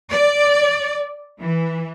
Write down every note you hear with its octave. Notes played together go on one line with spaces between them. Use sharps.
D5
E3